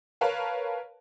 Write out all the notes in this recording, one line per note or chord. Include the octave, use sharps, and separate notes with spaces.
A#4 B4 C#5 F5 A5